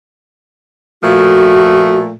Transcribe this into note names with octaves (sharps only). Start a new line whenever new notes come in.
A#2 F3 A3 F#4